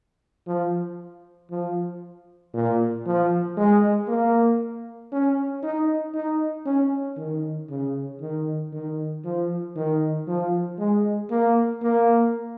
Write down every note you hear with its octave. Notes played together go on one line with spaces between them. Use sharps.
F3
F3
A#2
F3
G#3
A#3
C#4
D#4
D#4
C#4
D#3
C#3
D#3
D#3
F3
D#3
F3
G#3
A#3
A#3